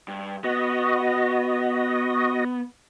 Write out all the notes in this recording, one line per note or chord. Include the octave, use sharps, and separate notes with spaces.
G2
B3 F#4 D#5